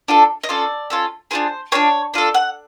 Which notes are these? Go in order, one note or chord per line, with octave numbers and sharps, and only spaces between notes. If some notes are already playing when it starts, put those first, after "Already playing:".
D4 F4 A4
D#5
C#4 F4 A4 D5
C#4 F4 A4
D4 F4 G#4 C5
D4 F4 G#4 C#5
D4 F4 A4
F#5